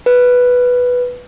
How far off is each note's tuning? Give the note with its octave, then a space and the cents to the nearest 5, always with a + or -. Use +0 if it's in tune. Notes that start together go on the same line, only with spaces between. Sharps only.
B4 +0